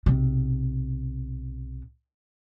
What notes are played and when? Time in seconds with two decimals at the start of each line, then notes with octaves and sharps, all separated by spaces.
0.06 B1 C3